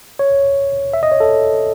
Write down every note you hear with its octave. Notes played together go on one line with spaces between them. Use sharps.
C#5
E5
D#5
C#5
A4